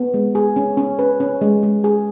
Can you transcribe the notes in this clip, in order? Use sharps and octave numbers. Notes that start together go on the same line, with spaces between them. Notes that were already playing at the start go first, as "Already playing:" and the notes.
Already playing: B3
G#3
G#4
C#4
C#4
B4
C#4
G#3
G#3
G#4